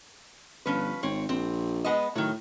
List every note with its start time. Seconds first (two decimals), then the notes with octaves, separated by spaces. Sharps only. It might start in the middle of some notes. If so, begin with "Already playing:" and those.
0.66 G1 F3 C#4 B4
1.03 G#1 C4 C#5
1.29 A#1 C4
1.84 G#3 B3 D#5
2.16 A2 D#3 F#3